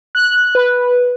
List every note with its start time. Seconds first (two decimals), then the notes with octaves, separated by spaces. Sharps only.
0.15 F#6
0.55 B4